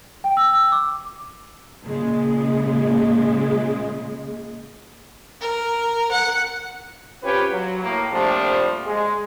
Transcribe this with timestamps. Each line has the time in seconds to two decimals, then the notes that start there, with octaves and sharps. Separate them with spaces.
0.24 G5
0.37 E6
0.53 E6
0.72 D6
1.84 A#2 C#3 G#3
5.41 A#4
6.12 F#5
7.23 C4 C#4 F4 G4 B4 C#5
7.52 F#3
7.82 A2 A#3
8.12 A#2 F3 G3 A3 C4 D4
8.85 G#3